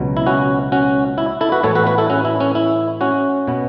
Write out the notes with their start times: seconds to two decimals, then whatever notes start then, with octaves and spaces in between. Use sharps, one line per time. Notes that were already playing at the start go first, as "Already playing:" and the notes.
Already playing: C#2 B2 F#3
0.17 E4
0.26 C#4 F#4
0.72 C#4 F#4
1.18 E4
1.41 E4 A4
1.52 F#4 B4
1.63 A2 E3 B3 A4 C#5
1.75 F#4 B4
1.86 F#4 B4
1.98 E4 A4
2.10 C#4 F#4
2.25 E4
2.40 C#4
2.55 E4
3.01 C#4 F#4
3.47 B2 B3